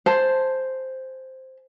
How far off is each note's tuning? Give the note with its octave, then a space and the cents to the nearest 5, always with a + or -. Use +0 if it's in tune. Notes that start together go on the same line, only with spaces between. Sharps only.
G#4 +0 C5 +0 A5 +0